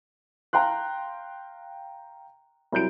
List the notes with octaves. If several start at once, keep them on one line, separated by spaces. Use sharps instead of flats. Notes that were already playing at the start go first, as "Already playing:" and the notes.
F5 G5 A#5 C6 F#6
C2 F#3 G6 D7